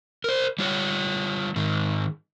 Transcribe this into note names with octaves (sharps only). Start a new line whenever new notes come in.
A#4 C5
G3 F4 C#5
G#2 D#3